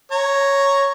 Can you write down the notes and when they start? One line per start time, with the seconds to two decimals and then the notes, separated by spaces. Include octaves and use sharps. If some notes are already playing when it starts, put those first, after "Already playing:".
0.12 C#5 A#5